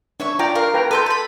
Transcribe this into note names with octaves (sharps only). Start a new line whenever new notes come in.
D4 C#5 E5 C#6
F4 D5 G5 A#5
A#4 F5
B4 G5 A#5
A4 B4 C6 G6
A5 B5